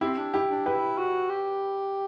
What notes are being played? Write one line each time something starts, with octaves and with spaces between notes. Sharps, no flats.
C4 E4 G4
D4
E4 G4
D4
E4 G4 B4
F#4
G4